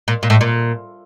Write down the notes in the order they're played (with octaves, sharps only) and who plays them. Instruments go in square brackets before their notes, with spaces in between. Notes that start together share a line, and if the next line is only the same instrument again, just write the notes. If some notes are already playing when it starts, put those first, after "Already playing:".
[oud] A#2
A#2
A2
A#2